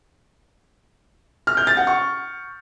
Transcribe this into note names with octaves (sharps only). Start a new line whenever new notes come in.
F6
G6
A6
F#5
C#6